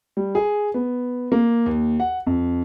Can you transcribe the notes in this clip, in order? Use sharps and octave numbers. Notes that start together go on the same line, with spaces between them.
G3
G#4
B3
A#3
D#2
F#5
F2